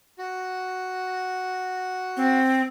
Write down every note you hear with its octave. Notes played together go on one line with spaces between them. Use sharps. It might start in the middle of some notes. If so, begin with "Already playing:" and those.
F#4
C4